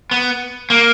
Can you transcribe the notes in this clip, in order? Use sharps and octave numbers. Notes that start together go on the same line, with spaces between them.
B3
A#3